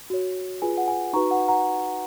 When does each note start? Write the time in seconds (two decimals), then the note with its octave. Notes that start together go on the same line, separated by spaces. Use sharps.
0.10 F#4 C#5
0.62 F4 G#4 B4 G#5
0.77 F#5
0.88 G#5
1.13 D#4 F#4 B4 A#5 C#6
1.31 F#5
1.48 F#5 A#5